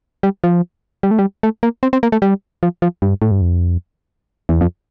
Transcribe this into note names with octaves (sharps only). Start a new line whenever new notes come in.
G3
F3
G3
A3
G3
A3
A#3
C4
C4
A#3
A3
G3
F3
F3
G2
A2
G2
F2
E2
F2